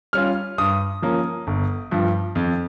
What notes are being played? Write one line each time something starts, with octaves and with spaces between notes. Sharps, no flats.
G3 C#4 F4 F6
G2 D#6
F3 A#3 C#4
G1
G2 F3
F2